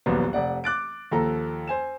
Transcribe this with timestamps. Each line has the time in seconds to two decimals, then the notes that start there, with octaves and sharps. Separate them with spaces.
0.06 D#1 A#1 F#3 B3
0.33 F1 D5 F#5
0.64 D6 F#6 A6 D7
1.11 D#2 F3 A4 A#5
1.68 C5 G#5 E7